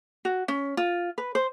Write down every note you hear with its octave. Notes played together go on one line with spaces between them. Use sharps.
F#4
C#4
F4
B4
C5